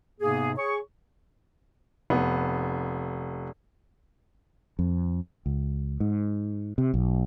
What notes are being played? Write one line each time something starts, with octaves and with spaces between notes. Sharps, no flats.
G#2 C3 A#3 B3 G#4
G#4 C#5 C#6
F1 B3
F2
C#2
G#2
C3
B1